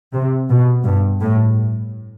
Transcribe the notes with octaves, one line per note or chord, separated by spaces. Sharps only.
C3
B2
G2
A2